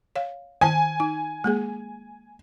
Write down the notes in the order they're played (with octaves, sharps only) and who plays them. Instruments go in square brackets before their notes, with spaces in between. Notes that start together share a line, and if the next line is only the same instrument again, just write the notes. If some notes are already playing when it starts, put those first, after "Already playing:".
[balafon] C#5 F5
[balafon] D#3 C5 A5 [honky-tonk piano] G#5
[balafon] D#4
G#3 A#3 G#4